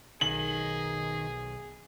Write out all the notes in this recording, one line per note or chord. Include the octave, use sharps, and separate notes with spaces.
B1 D#3 G#4 F#7